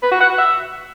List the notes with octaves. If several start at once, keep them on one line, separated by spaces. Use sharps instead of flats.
B4
F#4
F#5
F#4
E5